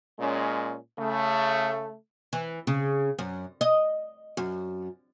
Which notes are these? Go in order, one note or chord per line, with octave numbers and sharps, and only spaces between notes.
A#2 G#3 C#4
C#3 A3
E3
C#3
F#2
D#5
F#2